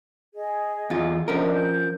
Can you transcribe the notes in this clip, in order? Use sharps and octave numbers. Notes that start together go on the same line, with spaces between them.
G#4 D#5
E2 F4
F3 C#4 D4 A#4 D#5
G6